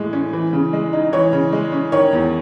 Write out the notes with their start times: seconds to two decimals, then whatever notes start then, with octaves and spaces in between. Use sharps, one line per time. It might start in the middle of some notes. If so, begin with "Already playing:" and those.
Already playing: A2 E3 G#3
0.13 C#4
0.33 E3
0.53 C#3
0.73 G#3
0.93 D#4
1.13 E3 C#5
1.33 C#3
1.53 G#3
1.72 C#4
1.92 D#3 C#5
2.13 E2